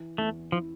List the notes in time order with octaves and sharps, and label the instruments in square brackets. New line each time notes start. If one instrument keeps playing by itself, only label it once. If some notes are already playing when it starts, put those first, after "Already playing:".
Already playing: [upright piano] E3
[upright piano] E2 [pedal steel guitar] A3
[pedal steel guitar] F3 [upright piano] E4